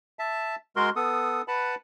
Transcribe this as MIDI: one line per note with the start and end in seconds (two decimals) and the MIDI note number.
0.19 0.55 76
0.19 0.55 81
0.76 0.90 56
0.76 0.90 66
0.76 0.90 70
0.76 0.90 84
0.96 1.42 59
0.96 1.42 69
0.96 1.42 87
1.48 1.75 71
1.48 1.75 78
1.48 1.75 81
1.48 1.75 83